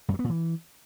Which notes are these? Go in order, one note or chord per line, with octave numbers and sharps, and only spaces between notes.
F#2
F#3
B3
A#2
E3